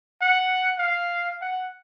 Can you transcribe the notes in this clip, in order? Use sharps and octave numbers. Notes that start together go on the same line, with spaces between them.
F#5
F5
F#5